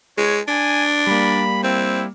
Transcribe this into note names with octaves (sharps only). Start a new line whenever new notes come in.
G#3 C#5
D4 G#5
G3 A#3 B5
C4 E4